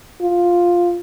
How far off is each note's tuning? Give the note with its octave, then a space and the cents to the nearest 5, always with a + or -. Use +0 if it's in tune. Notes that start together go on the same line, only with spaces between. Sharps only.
F4 +5